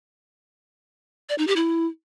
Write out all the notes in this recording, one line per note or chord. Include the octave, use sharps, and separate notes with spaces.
D5
D#4
G4
E4